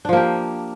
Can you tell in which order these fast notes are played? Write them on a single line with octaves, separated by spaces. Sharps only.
D4 F3 A#3 G4